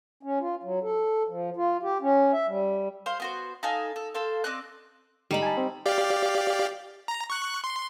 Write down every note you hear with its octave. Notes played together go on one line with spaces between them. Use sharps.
C#4
F4
F#3
A4
F3
F4
G4
C#4
E5
G3
C5 F5 C6
B3 F#4 C5
D#4 A4 F5 G#5
A4
A4 C5 F5
C4 D5 D#5 F#6
G#2 D3 G3 D#4 B5
G#5 A5
C4
G4 D5 F5
A#5
C#6 F#6
C6